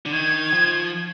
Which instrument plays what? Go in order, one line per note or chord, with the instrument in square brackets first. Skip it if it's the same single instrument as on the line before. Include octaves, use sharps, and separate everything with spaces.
[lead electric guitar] D3
[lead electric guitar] D#3 [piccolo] G#6
[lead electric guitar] F3